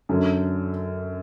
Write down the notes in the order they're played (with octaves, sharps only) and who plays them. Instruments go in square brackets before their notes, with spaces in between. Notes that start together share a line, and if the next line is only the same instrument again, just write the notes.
[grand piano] F#2 D3 F#3